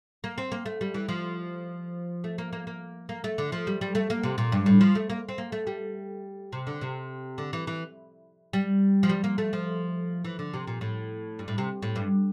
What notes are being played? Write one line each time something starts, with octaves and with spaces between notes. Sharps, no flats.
A#3
C4
A#3
A3
G3
E3
F3
A3
A#3
A#3
A#3
A#3
A3
D3
F3
G3
G3
A3
A#3
C3
A#2
G2
A2
F3
A3
A#3
C4
A#3
A3
G3
C3
D3
C3
D3
E3
E3
G3
F3
G3
A#3
A3
F3
E3
D3
C3
A#2
A2
G2
A2
C3
A2
G2